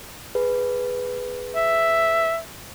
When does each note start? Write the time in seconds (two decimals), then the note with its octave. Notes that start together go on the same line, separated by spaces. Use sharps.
0.35 G#4 B4
1.55 E5